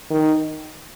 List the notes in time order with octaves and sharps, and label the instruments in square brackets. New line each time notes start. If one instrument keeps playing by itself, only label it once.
[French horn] D#3